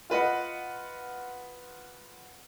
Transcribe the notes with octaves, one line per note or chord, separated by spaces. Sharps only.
F4 B4 D#5 F#5